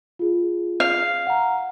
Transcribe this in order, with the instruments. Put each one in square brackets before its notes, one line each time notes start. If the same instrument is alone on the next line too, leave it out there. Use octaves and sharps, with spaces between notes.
[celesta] F4 G#4
[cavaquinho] F5
[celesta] F#5 A#5